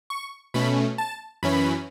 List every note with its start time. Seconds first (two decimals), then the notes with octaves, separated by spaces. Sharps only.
0.10 C#6
0.54 B2 A3 C#4 B5
0.98 A5
1.43 F#2 E3 C#4 B5